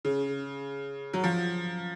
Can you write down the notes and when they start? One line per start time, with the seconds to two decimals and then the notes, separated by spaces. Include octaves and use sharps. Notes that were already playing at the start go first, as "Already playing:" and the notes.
0.05 C#3
1.14 F#3
1.24 F3